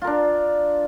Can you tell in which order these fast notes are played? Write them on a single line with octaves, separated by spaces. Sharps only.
F4 A#4 D4